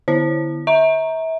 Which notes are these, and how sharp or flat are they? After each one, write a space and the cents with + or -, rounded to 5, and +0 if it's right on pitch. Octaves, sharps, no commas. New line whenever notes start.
D3 +10 E4 +0 C5 +0
E5 -30 A#5 +0